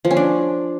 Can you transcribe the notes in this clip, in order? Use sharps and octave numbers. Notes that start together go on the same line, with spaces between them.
F3
C#4
D4